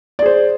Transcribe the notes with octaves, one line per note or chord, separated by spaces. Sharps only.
G#4 C5 D5